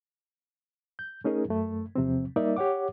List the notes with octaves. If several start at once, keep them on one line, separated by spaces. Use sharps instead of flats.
G6
A3 C#4 D#4 G#4 A#4
F#2 A3
E2 C3 F3 C4
G3 A#3 D#4 A#4 D5 E5
G4 C#5 F#5 D6